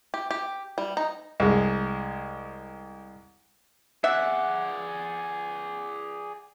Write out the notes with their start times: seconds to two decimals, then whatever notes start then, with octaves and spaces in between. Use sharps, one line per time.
0.14 G4
0.31 G4
0.78 G3
0.97 D#4
1.40 C2 G#3
4.04 G#4 D5 E5 F#5